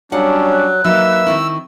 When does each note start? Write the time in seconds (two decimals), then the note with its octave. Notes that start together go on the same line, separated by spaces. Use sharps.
0.12 F#3 G3 C#4 D4 F5 F#5 A5
0.53 F#6
0.84 F#3 A#3 D#4 B4 E5 E6
1.27 D#3 C4 E4 C#6